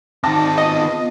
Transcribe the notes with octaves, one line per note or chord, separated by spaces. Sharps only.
D#3 C4 D#4 G#4 D5 A5 D6 A#6
B3 F4 D#5